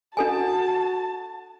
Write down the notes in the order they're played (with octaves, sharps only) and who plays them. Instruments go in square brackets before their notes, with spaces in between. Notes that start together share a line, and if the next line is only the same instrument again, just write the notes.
[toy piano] D4 A4 G#5 [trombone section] F#4 [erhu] A5